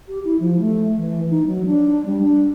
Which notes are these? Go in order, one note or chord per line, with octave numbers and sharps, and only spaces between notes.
G4
E4
F3
A3
E3
D#4
F#3
D4
G3
D4